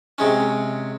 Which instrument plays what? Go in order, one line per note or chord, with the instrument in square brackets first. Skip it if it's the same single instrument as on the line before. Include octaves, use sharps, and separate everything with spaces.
[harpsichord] C3 G#3 C#4